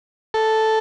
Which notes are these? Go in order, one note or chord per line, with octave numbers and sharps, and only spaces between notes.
A4